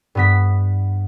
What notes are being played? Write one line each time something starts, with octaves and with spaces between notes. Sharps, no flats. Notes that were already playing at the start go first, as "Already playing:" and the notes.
G2 B3 B6